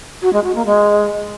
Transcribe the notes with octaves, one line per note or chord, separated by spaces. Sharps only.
F#4
G#3
F#4
A#3
G#3